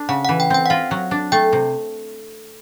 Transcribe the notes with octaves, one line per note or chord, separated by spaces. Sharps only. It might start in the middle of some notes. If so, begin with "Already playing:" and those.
Already playing: D4
C#3 F#5
F#5
E3
G5
C4 G5
F#5
F4 F5
F#3
D4
A3 G5
C3